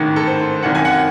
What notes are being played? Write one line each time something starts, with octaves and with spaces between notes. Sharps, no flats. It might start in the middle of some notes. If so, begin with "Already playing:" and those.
Already playing: A1 G#2 D#3
A4
C5
G#1 F#2 D#3 F#5
G#5
F#5